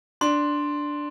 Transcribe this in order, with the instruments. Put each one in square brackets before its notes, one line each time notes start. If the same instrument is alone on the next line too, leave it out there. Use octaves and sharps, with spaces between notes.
[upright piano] D4 [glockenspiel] C6